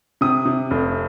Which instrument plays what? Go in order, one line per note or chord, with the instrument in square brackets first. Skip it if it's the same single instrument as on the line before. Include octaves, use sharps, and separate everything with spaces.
[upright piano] C3 D#6
C3
F1